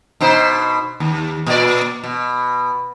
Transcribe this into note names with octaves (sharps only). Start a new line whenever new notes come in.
B2 D#4 C5
D#2
A#2 D5
B2